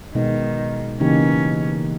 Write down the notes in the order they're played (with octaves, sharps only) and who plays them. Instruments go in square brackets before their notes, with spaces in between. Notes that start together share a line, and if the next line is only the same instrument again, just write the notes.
[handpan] B2 G#3 B3 D#4 [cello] D#3
[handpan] C#3 E3 A#3 D#4 G4 [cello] C#4